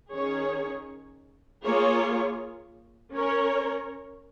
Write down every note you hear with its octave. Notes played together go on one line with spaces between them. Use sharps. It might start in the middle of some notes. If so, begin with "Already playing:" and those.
D#3 C#4 G#4 C#5
A#3 F4 G#4 C#5
C#4 A#4 C#5